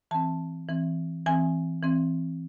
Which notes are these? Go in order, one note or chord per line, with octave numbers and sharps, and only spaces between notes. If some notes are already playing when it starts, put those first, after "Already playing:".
E3 C4 A5
E3 C4
E3 C4 G#5
E3 C4